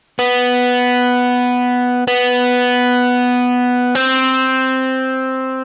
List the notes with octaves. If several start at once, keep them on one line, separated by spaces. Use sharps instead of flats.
B3
B3
C4